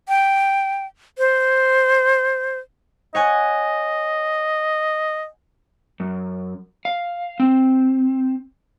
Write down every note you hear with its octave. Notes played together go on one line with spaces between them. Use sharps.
G5
C5
C#5 D#5 F#5 G#5
F#2
F5
C4